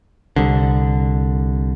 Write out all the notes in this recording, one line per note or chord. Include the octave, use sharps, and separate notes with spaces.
C2 D3